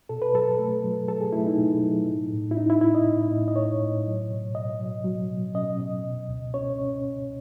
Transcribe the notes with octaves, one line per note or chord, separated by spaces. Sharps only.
B2 A4
B4
F#3 A4
A3
F#3
F#3 A4
G#4
A3 E4
D#4
B2
F#3
A2
A2
E4
C#4 D#4
E4
A2 E4
D#5
A2
A2
D#5
A2 C#5
A2
F#3
B2
B2 D#5
F#3
F#3
B2
C#4 D#5
B2
B2
C#2
C#4 C#5
C#4
C#2